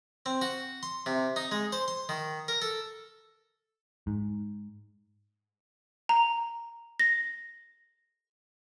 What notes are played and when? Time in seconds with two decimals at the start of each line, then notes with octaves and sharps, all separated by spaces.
0.26 C4
0.42 F#4
0.83 C6
1.06 C3
1.36 D#4
1.51 G#3
1.72 C5
1.88 C6
2.09 D#3
2.48 A#4
2.62 A4
4.07 G#2
6.09 A#5
7.00 A#6